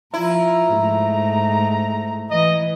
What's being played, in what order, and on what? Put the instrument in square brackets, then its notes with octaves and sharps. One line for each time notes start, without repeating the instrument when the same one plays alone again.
[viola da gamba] F3 F4 [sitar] E4 [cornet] A#5
[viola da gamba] G#2 A3
[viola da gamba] E3 [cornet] D#5